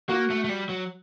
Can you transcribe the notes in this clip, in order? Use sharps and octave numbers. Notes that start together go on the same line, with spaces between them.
A#3 F#4
A3
A3
G3
F#3